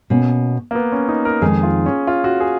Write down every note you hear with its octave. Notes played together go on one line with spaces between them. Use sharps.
B2 A#3 C#4
A#3
B3
C#4
D#4
A#4
F2 D#3 G#3 D#4 G#4
F4
C#4
F4
F#4
G#4